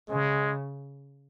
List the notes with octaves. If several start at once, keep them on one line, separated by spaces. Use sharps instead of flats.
C#3 G#3